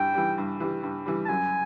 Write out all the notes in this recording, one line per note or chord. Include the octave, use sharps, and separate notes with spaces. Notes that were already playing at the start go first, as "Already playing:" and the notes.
Already playing: G2 E3 G3 G5
E3 G3
G2
E3 G3
G2
E3 G3
A5
F#2 G#5